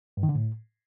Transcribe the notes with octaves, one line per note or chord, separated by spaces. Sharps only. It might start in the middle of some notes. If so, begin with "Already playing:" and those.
G2
D#3
D3
A2